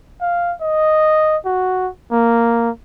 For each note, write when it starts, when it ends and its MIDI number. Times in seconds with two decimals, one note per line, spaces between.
0.21 0.53 77
0.61 1.37 75
1.45 1.89 66
2.12 2.70 58